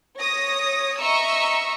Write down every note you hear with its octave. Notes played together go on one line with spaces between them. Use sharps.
C#5 D#6 A#6
D#5 E5 A#5 C#6 E6